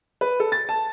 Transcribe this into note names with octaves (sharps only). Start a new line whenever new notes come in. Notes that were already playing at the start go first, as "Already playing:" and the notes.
B4
A4
A6
A5